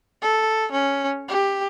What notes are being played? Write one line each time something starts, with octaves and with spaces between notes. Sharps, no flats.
A4
C#4
G4